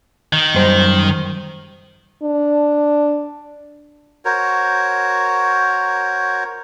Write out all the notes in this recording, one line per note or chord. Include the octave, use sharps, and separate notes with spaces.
D#3
F#2 G3 C5
D4
F#4 A#4 C5 C#5